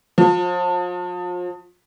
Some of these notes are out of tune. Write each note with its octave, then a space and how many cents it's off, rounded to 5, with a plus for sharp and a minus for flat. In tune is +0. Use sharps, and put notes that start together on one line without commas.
F3 +35